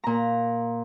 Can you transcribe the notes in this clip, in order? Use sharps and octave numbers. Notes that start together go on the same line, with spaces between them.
A#2 A#5